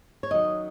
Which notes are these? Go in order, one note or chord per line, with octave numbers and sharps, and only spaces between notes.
C#5
F#2 D#3 F#3 D#5